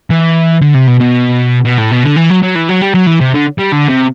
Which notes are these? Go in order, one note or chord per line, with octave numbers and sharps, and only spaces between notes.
E3
D3
C3
B2
B2
B2
A2
B2
D3
E3
F#3
F#3
E3
F#3
G3
F#3
E3
C3
D3
G3
D3
C3